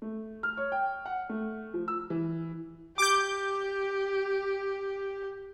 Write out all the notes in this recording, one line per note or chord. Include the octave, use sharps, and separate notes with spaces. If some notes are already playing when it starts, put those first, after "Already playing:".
A3
F6
C#5
G5
F#5
A3
F3
E6
E3
G4 D6 G6